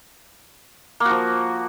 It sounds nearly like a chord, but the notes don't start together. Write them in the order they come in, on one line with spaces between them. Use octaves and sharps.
A#3 F#4 F3